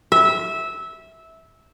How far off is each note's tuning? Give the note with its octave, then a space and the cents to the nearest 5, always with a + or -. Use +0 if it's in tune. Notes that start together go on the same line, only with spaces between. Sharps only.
E5 -15